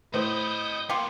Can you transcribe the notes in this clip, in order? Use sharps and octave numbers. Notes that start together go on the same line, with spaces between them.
A2 C5 D#5 B5 D#6 G6
A#3 B3 F4 G4